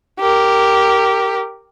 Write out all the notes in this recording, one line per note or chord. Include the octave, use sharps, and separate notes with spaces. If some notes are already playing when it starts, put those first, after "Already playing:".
G4 A#4